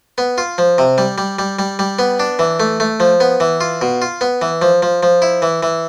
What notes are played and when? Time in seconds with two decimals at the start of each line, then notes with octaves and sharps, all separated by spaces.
0.18 B3
0.38 F4
0.58 F3
0.78 C3
0.98 G3
1.18 G3
1.39 G3
1.59 G3
1.79 G3
1.99 B3
2.20 D4
2.39 E3
2.60 A3
2.80 A3
3.00 F3
3.20 B3
3.40 E3
3.61 F4
3.81 B2
4.02 F4
4.21 B3
4.42 E3
4.62 F3
4.82 F3
5.03 F3
5.22 E4
5.42 E3
5.63 E3